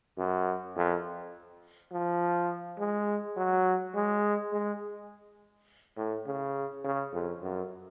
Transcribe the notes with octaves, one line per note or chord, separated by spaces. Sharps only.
F#2
F2
F3
G#3
F#3
G#3
G#3
A2
C#3
C#3
F2
F#2